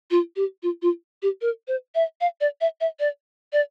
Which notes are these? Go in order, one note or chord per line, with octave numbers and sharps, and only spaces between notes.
F4
G4
F4
F4
G4
A#4
C5
E5
F5
D5
E5
E5
D5
D5